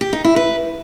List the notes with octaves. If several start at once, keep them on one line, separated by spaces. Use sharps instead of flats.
G4
D#4
E4
B4